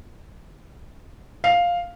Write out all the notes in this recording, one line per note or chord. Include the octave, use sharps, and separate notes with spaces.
F5